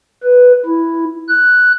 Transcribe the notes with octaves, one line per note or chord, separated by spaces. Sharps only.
B4
E4
F#6